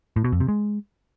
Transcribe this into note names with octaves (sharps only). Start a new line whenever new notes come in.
A2
B2
F2
C3
G#3